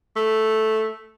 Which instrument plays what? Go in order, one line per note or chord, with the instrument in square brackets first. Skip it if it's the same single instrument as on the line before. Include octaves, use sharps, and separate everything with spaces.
[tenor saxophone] A3